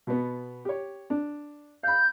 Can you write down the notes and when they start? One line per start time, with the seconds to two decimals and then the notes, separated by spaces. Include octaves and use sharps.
0.07 B2 B3
0.65 G4 C#5
1.10 D4
1.83 F5 B5 G6